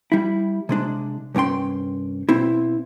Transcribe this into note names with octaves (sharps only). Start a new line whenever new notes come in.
G3 E4
C3 G#3 D4
C2 G2 C#4 G5 C6
B2 C4 E4